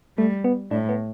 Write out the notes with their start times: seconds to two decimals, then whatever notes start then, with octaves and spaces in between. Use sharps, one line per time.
0.17 G3 A3
0.44 B3
0.71 A2 D4
0.89 B3